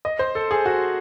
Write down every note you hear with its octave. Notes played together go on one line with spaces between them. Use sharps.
D#5
C5
A4
G#4
F#4